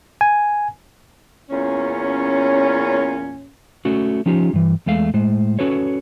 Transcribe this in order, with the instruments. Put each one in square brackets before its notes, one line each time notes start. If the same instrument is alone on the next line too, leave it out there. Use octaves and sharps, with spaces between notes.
[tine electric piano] G#5
[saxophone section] E2 A#2 C#4
[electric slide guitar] A3 C#4 F#4
F3 C#4 D#4 F4 G4
G2 E3
E2 G#3 A3 F5
A2 G#3 C5
C#4 F#4 A4 B4 C#5